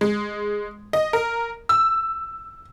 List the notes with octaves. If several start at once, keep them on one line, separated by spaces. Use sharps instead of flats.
G#3
D#5
A#4
E6